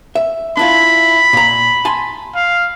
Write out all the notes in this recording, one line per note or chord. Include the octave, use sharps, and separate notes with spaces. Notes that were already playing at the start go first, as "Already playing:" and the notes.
E5
D4 E4 F4 B5
A#2 A#5
G#5 A5 C6
F5